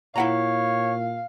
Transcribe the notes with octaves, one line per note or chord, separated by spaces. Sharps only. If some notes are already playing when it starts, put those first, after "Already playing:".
A#2 E4 C#5 F5 F#5 A#5